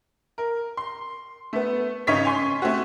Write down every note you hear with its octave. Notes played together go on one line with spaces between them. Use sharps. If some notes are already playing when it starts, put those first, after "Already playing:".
A#4
C6
A3 B3
G#1 C#3 C#4 D#4 C#5 B6
G#5 C6 C#6
A3 C4 C#4 F#4